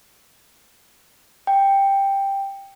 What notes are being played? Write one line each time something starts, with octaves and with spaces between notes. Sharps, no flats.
G5